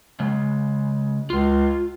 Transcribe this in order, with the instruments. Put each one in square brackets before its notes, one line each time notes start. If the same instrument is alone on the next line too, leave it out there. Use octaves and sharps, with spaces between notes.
[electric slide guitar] C#3 G#3
[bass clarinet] C#2 [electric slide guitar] F4